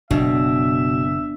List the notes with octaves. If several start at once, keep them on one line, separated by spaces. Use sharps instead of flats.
F#1 B2 D4 E5